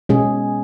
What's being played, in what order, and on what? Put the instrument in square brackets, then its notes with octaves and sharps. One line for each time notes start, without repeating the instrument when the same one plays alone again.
[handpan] B2 G#3 C#4 G#4